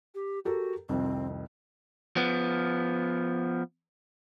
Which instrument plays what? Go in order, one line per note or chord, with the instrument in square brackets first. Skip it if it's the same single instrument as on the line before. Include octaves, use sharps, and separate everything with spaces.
[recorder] G4
[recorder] F#4 [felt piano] G4 A4 A#4
[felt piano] C2 F2 D#3 [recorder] C4
[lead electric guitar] F3 B3